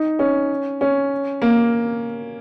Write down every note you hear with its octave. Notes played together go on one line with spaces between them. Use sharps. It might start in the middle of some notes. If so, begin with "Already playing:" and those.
Already playing: D#4
C#4
C#4
A#3